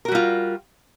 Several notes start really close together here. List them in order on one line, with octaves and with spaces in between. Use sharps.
A#4 F#4 G3 F4